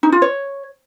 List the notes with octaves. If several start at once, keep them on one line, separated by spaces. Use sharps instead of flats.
D#4
F4
C#5